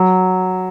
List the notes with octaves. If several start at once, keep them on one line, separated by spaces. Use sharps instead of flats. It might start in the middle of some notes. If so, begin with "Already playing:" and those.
Already playing: F#3